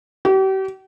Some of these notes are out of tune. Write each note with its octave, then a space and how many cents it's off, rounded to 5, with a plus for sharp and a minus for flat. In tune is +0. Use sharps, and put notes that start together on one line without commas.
G4 -40